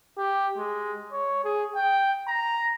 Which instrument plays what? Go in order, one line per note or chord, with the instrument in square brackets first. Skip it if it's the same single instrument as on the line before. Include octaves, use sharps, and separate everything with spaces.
[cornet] G4
G#3
C#5
G#4
G5
A#5